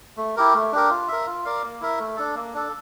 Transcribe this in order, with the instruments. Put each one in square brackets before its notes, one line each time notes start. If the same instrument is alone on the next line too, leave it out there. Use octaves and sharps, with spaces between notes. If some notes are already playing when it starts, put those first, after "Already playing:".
[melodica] A3
E4 G4 A#4
A3
D4 G4 A#4
F4
A#4 E5
F4
A#4 D5 F5
A#3
E4 A#4 E5
A3
D4 A4
A#3
D4 A4